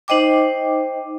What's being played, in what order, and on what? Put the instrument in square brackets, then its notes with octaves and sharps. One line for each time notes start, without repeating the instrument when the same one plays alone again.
[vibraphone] D#4 C5 D#5 G5 D6